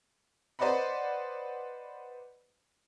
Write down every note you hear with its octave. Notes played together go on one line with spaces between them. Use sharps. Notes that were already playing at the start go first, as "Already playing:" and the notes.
B4 C5 D5 D#5 F#5 B5